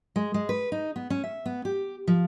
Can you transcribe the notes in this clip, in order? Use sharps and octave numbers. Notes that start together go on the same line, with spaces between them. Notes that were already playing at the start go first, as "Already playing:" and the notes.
G#3
G#3
B4
D#4
B3
C#4
E5
B3
G4
F3